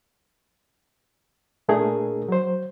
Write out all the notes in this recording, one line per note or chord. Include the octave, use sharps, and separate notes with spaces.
A#2 A3 D4 G#4 A#4
F#3 C5